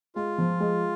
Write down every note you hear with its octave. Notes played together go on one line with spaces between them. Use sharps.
G#3 F4
F3
G#3